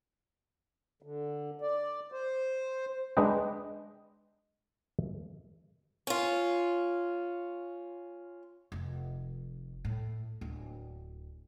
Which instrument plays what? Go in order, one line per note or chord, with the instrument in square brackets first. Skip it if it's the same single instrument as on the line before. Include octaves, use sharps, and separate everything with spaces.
[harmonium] D3
D5
C5
[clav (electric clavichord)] G#3 D4 B4 D#5 G5
[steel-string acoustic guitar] C#4 F4
[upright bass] F1
A2
D1